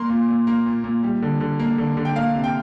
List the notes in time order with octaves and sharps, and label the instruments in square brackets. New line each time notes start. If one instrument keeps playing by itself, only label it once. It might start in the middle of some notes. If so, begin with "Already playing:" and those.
Already playing: [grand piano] A#3 C6
A#2
A#2
A#3
A#2
A#2
G3
D3
D3
A#3
D3
D3
G5
A#3 F5
C3
G5